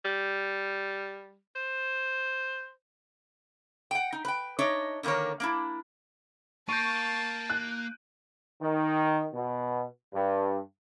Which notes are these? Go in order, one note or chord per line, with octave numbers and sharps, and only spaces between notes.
G3
C5
F#5 G5
D#4
B4 G5
D4 D#4 C#5 D#5 E5
D3 D#3 A#3 A#4 C#5
A#3 D4 E4
A#3 A5 C#6 G6 D7 D#7
F#6
D#3
B2
G2